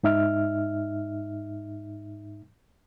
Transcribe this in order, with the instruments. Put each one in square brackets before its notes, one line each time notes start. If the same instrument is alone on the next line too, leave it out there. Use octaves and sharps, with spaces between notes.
[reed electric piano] G#2 D#4 E5 F6